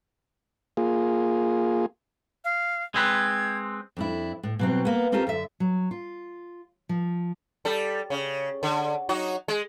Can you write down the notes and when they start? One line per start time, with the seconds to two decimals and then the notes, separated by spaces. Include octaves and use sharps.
0.77 A#3 F4 G#4
2.45 F5
2.94 G#3 C4 B4 G#6
3.97 F2 D4 E4
4.43 A2
4.59 B2 F#3 C4
4.85 A#3 B3
5.12 C4 C#4 F4 G4 A4 A#4
5.27 F#2 D3 E5
5.60 F#3
5.91 F4
6.89 F3
7.65 G3 A4
8.10 C#3
8.63 D3
9.09 F#3 D#4 F#4
9.48 G#3